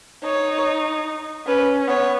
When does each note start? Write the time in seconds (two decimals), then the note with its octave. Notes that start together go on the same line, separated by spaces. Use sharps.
0.23 D#4 C#5
1.47 C#4 B4
1.88 B3 C#5